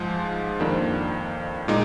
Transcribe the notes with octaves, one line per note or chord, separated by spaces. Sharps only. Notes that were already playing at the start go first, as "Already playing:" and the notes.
Already playing: G#2 F3 G#3
F2 D#3 A#3 D4
A#2 G#3 D#4